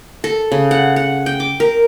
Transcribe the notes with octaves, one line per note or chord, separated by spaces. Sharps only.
A4
C#3
F#5
F#5
G5
D6
A#4